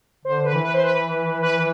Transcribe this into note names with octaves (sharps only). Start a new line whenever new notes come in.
D3 C5
B4
E3
B4
C5
B4
B4